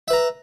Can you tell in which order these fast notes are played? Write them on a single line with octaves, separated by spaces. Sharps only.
E5 B4 A#5